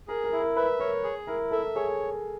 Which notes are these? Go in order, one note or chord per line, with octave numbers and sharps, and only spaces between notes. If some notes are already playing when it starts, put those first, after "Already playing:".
G#4 A#4
A#4
E4
A#4
B4 E5
A#4 C#5
G#4
E4 A#4
A4 E5
G#4 C#5